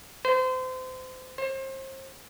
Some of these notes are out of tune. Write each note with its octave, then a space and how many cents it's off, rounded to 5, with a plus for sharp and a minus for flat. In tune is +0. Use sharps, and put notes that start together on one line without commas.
C5 -30
C5 +35